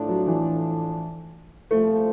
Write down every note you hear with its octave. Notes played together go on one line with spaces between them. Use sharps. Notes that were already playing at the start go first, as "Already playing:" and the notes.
Already playing: A2 F3 A3 D4
F#3
E3
C2 A#2 F3 A3